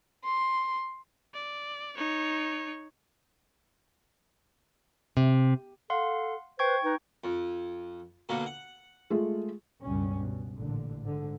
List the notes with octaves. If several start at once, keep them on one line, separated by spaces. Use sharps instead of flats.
C6
D5
D#4 C#5
C3
A4 F5 F#5 C6
B4 C5 G5 C#6 G#6
D#4 B4
F2
B2 D3 A#3
F#5
G#3 A3 F4
C#2 G2 B2 G3 C#4
B2
A1 A#2 D3
G#2 D3